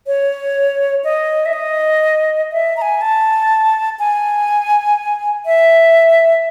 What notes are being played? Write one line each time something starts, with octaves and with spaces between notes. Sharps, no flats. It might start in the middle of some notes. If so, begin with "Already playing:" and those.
C#5
D#5
E5
D#5
E5
A#5
G#5
A5
G#5
E5